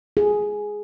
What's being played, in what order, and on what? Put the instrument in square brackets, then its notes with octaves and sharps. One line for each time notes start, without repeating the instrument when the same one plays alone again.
[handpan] G#4